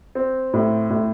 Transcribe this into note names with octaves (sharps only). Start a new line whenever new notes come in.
C4
A2
A2